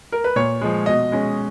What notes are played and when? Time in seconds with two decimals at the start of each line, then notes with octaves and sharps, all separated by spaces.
0.12 A#4
0.24 B4
0.36 A#2 C#5
0.61 F3 G#3
0.86 B2 D#5
1.12 G#3 C#4